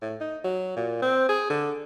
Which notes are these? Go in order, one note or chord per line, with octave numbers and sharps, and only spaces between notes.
A2
D#4
F#3
A#2
C4
G#4
D3